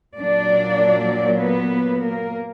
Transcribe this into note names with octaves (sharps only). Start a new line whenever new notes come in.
A#2 F#3 A#3 D4 D5
B3 B4
A#3 A#4